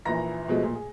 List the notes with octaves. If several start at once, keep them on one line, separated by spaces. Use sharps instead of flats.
A#1 A#2 E3 B4 A#5 A#6
B2 F3 G#3 A3
A#2
G#4